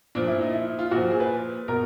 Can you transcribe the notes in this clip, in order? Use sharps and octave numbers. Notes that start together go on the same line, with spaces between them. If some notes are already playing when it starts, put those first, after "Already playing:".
A#2 F3 D4
E4
D#4
E4
F4
A#2 F3 F#4
G#4
B4
B2 A#4